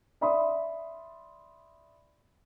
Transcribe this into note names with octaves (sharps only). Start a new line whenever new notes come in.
D5 E5 B5 C6 D#6